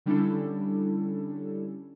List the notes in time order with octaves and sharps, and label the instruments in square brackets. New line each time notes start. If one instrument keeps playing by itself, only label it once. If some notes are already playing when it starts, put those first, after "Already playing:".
[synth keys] D3 G3 C#4 D4 E4 A4